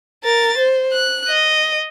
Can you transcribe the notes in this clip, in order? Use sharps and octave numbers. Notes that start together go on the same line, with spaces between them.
A#4 A6
C5
F#6
D#5